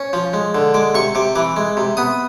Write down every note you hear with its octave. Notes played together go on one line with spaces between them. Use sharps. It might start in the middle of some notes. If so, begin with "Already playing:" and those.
Already playing: C#4
F3
G#3
D3
G#3 D6
C3 C#6
C3 D6
E3 D6
G#3
C3
B3 D#6